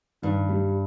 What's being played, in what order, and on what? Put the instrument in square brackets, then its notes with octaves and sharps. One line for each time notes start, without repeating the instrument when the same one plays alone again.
[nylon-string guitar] G2 [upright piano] D#3
[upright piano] G3